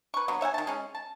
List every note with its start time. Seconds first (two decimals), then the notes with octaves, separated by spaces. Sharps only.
0.14 B4 C#6
0.28 D3 F#3 B3
0.41 C#5 E5 F#5 G#5
0.54 D#3 A5
0.67 G#3 C#4
0.95 A5